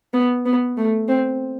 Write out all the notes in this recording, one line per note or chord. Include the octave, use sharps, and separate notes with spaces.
B3
B3
A3
C4